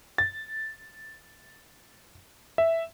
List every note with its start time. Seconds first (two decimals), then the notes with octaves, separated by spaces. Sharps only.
0.18 A6
2.58 E5